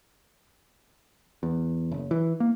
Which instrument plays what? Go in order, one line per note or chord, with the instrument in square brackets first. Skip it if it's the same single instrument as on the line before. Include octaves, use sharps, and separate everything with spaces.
[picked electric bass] E2
F#1
E3
A#3